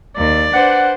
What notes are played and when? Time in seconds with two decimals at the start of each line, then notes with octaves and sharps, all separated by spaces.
0.17 D#2 D5
0.53 D4 B4 C5 F#5